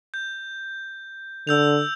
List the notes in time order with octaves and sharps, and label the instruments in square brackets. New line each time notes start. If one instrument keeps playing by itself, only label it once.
[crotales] G6
[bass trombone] D3 [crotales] E6 G6 F7